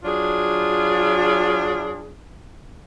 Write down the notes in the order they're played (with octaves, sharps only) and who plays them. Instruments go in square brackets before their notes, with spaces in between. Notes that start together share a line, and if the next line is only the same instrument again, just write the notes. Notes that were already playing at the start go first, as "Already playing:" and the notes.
[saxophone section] F#3 D4 F4 G#4